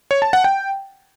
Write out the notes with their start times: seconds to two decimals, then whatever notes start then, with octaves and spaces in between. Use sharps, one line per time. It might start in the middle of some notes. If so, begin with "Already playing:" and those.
0.11 C#5
0.22 A5
0.33 F#5
0.44 G5